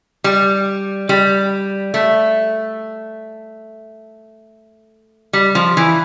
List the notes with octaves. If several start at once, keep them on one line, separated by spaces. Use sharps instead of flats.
G3
G3
A3
G3
F3
E3